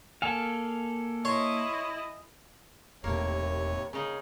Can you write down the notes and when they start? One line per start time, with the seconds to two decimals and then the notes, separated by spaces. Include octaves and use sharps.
0.22 A#3 A4 F5 G#5
1.25 E4 C#5 D#5 C6
3.04 E1 D#2 A2 C3 A#3 C#5
3.93 C#3 D#4 G#4